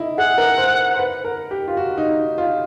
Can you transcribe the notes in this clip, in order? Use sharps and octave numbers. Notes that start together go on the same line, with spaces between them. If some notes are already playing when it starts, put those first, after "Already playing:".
Already playing: D#4 E4
G#4 F#5
A#4
C5
C5
C5
B4
A#4
G4
F4
F#4
D#4
F4